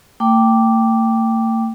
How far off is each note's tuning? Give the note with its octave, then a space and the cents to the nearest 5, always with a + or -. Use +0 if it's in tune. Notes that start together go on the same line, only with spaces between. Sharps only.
A3 +45 G5 +0 D6 +0